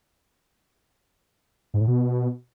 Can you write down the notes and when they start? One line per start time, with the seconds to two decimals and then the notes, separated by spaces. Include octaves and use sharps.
1.74 G#2
1.81 A2
1.87 B2